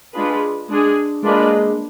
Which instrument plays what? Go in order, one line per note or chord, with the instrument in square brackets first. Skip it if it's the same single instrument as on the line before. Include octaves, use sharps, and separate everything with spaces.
[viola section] G#3 D4 F4 G#4 B4
G#3 D4 G#4
[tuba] G#3 [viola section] A#3 D4 F4 B4 D5